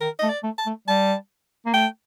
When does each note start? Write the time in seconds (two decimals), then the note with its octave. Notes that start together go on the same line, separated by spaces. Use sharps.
0.01 D#3 A#4
0.19 A3 D#5
0.30 D5
0.43 A3
0.58 A5
0.66 A3
0.88 G3 A5
1.66 A#3
1.74 A3 G5